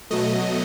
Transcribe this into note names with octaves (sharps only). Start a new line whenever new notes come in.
B2 F#3 A3 D#5